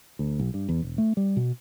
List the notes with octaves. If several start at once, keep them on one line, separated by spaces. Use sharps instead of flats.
D2
B1
G2
E2
E1
A3
G3
B2